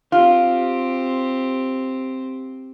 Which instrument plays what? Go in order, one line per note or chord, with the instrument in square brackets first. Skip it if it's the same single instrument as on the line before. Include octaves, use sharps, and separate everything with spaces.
[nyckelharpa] C4 G4 [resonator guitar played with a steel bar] F4